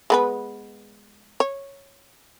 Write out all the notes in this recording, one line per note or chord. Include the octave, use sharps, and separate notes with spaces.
G#3 B3 B4
C#5